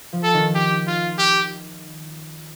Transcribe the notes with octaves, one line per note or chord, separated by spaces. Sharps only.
F3
A4
D#3
G4
F4
G4